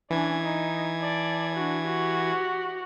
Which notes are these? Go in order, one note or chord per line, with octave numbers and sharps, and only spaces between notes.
E3 C#4 D4 G#6
D#4
D5 A5
D4 F#4
F#4 G4